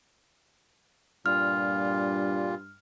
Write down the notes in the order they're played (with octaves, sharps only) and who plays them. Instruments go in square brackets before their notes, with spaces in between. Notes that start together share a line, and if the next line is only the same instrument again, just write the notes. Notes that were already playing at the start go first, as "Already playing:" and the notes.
[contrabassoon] G2 [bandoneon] A#2 G3 F4 [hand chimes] F6